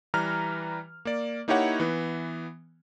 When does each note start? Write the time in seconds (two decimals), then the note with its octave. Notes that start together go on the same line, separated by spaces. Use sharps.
0.14 E3 G3 B4 A#5 F6
1.05 A#3 D5
1.48 A#3 D#4 E4 G4 C#5 F#5
1.80 E3 B3